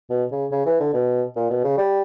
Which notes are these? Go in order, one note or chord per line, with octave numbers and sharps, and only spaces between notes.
B2
C#3
C#3
E3
D3
B2
A#2
B2
C#3
G3